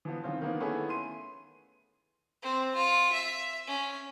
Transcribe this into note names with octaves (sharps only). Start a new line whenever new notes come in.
E3 F3 B3
D#3 E3 C4 C#4 F4 C5
D#3 E3 A#3 B3
D#3 A3 B3 C#4 E4 G#4
C6 D#7
C4
F4
E5
C#4